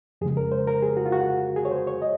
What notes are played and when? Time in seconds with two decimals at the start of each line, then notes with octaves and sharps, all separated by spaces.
0.21 F2 G#4
0.25 C#3 G#3
0.37 A#4
0.52 C5
0.67 A#4
0.82 G#4
0.97 F#4
1.06 F4
1.12 F#4
1.56 G#4
1.65 C#5
1.71 C5
1.87 C#5
2.02 D#5